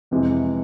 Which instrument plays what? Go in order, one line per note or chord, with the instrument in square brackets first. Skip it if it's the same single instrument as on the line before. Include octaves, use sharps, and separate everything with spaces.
[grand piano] F2 C3 E3 G#3